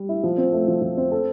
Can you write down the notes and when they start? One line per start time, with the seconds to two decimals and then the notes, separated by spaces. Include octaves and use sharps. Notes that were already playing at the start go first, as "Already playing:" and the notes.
Already playing: G3
0.09 E4
0.23 F3
0.38 C4
0.52 A3
0.68 F3
0.81 F3
0.97 C4
1.11 A4